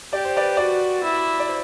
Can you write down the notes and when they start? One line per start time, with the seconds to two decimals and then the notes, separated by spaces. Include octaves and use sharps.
0.13 G4 D5
0.25 C5
0.36 B4 D5
0.57 F#4 B4 D5
1.03 E4
1.40 D5
1.48 C5